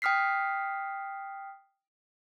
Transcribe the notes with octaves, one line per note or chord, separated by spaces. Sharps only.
G5 D#6 F6 B6 C7